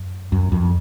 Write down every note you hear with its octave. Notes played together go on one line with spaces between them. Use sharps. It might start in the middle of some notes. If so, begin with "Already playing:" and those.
Already playing: F#2
F#2
F2